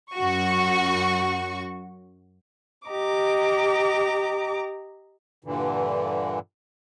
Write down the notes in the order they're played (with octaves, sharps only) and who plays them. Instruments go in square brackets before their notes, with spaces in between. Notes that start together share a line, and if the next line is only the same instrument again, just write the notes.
[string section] F#2 F#4 C#6
[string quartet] G4 D#5 A#5 D6
[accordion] G2 A#2 D3 E3